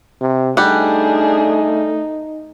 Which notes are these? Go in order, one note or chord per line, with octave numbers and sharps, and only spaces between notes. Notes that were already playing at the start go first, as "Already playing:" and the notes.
C3
G3 A3 D4 D#4 G#4 F#5